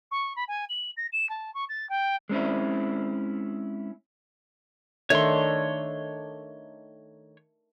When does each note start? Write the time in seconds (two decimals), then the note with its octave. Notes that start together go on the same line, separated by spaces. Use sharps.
0.11 C#6
0.36 B5
0.48 G#5
0.69 F#7
0.97 A#6
1.12 E7
1.29 A5
1.54 C#6
1.69 A6
1.89 G5
2.29 G#3 C4 C#4 E4
5.10 D#3 A3 D4 C#5 C6